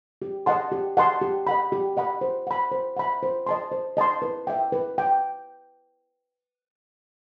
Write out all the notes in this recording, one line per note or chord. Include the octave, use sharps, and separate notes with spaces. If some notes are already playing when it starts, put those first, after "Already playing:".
G4
D#5 F#5 A5 C6
G4
D#5 F#5 A5 C6
G4
D#5 F#5 B5
G4
D#5 F#5 B5
C5
F#5 B5
C5
F#5 B5
C5
D#5 A5 C6
C5
D#5 A5 C6
B4
E5 G5
B4
G5